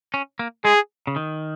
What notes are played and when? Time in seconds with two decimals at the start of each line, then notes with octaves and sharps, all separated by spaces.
0.14 C#4
0.39 A#3
0.65 G#3 G#4
1.07 C#3
1.16 D#3